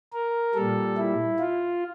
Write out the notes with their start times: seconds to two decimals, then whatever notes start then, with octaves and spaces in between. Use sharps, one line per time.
0.13 A#4
0.55 A#2 G3 A4
0.97 E4
1.39 F4